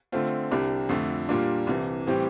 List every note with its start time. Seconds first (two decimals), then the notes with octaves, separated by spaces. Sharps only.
0.12 D3 A3 C4 F4
0.51 C2 C3 G3 D4 G4
0.89 F2 D3 A3
1.29 A#2 G3 A#3 D4 F4
1.67 C2 C3 E3
2.07 A2 E3 G3 C4 G4